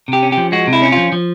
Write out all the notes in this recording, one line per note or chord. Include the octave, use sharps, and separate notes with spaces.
C3 G4
C#4
F3 G4
G#3 F#4
C3
E4
C#4
F3 F4
F3